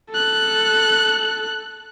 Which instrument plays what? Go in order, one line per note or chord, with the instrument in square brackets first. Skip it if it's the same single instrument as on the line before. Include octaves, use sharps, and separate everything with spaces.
[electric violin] A4 F#6